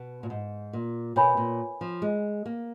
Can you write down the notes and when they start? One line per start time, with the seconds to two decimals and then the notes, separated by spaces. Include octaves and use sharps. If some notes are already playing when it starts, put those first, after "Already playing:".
Already playing: B2
0.23 A#2
0.30 G#2
0.73 A#2
1.16 B2 A#4 C#5 G#5 B5
1.37 A#2
1.81 F3
2.02 G#3
2.46 A#3